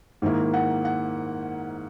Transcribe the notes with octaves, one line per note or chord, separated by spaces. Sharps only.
G#2 D#3 A#3 E4
F#5
F#5